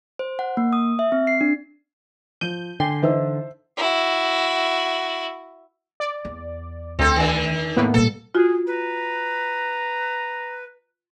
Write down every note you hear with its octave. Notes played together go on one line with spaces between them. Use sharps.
C5
F#5
A#3
D#6
E5
C4
C7
D4
F3 G6 D#7
D3 G5 G#5 C6
E3 D#4 C5 E5 E6
E4 F#4
D5
E2
D2 C4 A4
D3 D#3
A2 A#3 B3
A#2 G3 A4
F4 F#4 G#4
B4 A#5